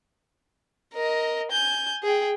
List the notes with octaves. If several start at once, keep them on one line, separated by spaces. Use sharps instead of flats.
A#4 D#5
G#5 G6
G#4 G5